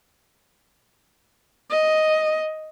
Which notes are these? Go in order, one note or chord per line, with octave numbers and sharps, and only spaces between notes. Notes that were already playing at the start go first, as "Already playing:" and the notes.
D#5